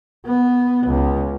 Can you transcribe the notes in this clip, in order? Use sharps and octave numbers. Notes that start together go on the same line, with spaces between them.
B3
C#2